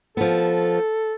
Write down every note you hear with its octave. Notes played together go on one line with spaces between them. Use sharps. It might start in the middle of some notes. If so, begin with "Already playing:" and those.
F3 B3 A4